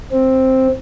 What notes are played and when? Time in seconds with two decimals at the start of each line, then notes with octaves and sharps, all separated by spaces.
0.12 C4